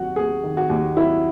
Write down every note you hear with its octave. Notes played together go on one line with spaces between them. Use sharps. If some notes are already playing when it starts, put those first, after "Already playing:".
Already playing: D#2 F#3 F#4 F#5
D#2 G#4
D#3
F#4
D#2
F#3 E4